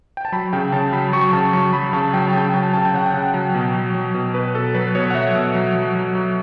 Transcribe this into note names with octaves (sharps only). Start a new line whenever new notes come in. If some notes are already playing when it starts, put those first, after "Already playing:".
G5
A5
F#3 B5
C#3 G5
C#3 A5
F#3 B5
F#3 C#6
C#3 A5
F#3 C#6
F#3 B5
C#3 A5
F#3 G5
A5
C#3 G5
F#3 A5
C#3 A5
G5
C#3 F#5
G5
C#3
F#3
B2
F#3
F#3
B2
B2 B4
B2 A4
F#3 B4
B2 C#5
F#5
F#3 E5
B2
F#3
F#3
F#3
F#3